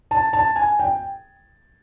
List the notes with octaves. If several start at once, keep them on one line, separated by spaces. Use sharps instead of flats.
A5
A5
G#5
G5